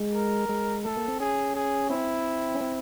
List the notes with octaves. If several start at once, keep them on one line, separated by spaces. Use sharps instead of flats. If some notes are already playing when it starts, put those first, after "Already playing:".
Already playing: G#3
A#4
G#3
A3 A4
A#3
C4
C#4 G#4
G#4
C4 E4
C#4
C4